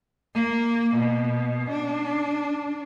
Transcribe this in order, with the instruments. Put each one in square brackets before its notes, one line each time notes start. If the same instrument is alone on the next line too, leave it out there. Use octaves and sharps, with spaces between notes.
[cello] A#3
B2
D4